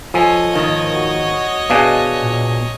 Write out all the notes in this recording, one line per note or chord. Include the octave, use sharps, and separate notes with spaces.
F3 A4 C#5 D#5 G#5
G#2 D#3 A#3
F#4
B2 D4 G#4 F5 G#5
A#2